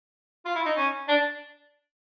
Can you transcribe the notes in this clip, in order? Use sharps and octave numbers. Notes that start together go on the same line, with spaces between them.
F4
E4
D#4
C#4
D4